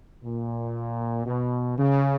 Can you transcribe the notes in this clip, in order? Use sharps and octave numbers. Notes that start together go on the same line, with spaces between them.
A#2
B2
C#3